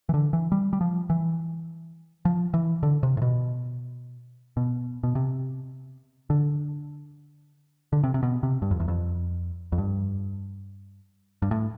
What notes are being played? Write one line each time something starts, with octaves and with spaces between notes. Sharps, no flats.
E3
D3
E3
G3
G3
F3
E3
F3
E3
D3
C3
A2
B2
B2
B2
C3
D3
D3
C3
C3
B2
C3
G2
F2
E2
F2
F2
G2
G2
A2